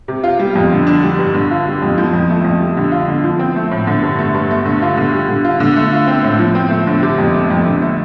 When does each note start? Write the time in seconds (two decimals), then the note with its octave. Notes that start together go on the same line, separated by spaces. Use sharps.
0.08 C3
0.24 F4
0.39 G3
0.55 F2
0.72 D3
0.87 D4
1.03 G3
1.18 G2
1.34 D3
1.51 F4
1.66 G3
1.82 F2
1.98 F3
2.13 F2
2.30 A3
2.44 F2
2.60 G3
2.77 D3
2.92 F4
3.08 D3
3.24 F3
3.39 C4
3.56 A3
3.71 A2
3.87 D3
4.02 G2
4.19 A3
4.35 G2
4.51 A3
4.65 D3
4.82 F4
4.97 D3
5.13 G3
5.28 D3
5.45 F4
5.60 D3
5.76 A3
5.92 F4
6.08 C4
6.24 A2
6.39 F3
6.55 C4
6.70 A3
6.87 D3
7.03 C3
7.18 F2
7.35 A3
7.50 F2
7.66 D3
7.82 A3